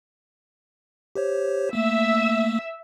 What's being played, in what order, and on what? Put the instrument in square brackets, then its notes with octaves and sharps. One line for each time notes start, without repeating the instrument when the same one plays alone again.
[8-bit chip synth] G4 C5 C#5
[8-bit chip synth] A3 A#3 [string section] E5 E6